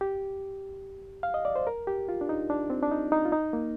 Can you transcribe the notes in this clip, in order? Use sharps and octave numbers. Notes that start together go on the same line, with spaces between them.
G4
F5
D#5
D5
C5
A#4
G4
F4
D4
D#4
D4
C4
D4
D#4
D#4
F4
D#4
A#3